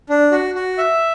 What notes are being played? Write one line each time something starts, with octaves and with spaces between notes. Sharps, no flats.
D4
F#4
F#4
E5